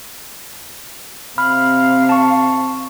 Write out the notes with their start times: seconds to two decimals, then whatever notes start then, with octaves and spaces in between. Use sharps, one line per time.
1.38 C3 F5 B5 F6
2.09 A5 C#6